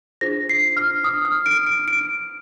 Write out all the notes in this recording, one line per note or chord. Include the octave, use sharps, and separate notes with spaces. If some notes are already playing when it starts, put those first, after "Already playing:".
D4 F4 G#4 C5 A#6
C7
F6
D#6
F6
D7
D7
D7